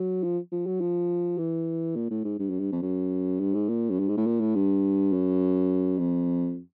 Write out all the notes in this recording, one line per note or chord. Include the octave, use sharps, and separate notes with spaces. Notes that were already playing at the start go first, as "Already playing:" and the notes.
Already playing: F#3
F3
F3
F#3
F3
E3
A#2
A2
G#2
G2
F#2
G2
F2
F#2
G2
G#2
A#2
F#2
G2
G#2
A2
A#2
A2
G2
F#2
F2